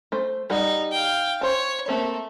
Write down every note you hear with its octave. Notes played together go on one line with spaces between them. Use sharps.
A3 C5
G3 D#4 G#4 F#5
F5 G5
C5 C#5 A5
A3 A#3 C4 A#4